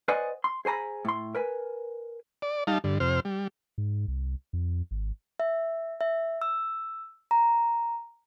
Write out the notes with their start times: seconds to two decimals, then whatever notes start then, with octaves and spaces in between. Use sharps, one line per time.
0.08 B4 C5 D5 D#5 F#5 G#5
0.44 C6
0.65 G#4 C5 G#5 A#5 B5
1.05 A2 C6
1.35 A#4 B4 G#5
2.42 D5
2.67 G3 D#4 F5 A5
2.84 G2 D3
3.00 F2 C3 C5 F6
3.25 G3
3.78 G#2
4.08 C2
4.53 F2
4.91 G#1
5.40 E5
6.01 E5
6.41 E6
7.31 A#5